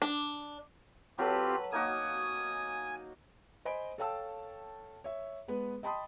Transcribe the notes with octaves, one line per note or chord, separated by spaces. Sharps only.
D4
F#3 C4 F4 G4 A4 B4
A#3 D#4 F#4 G#5 D#6
C5 D#5 G#5 B5 D7
A4 C#5 F5 G5 A5 E6
C#5 E5
G#3 B3 B4
D#5 G5 A5 B5 C6 D#6